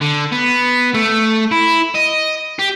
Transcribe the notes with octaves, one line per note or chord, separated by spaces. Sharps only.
D3
B3
A3
E4
D#5
G4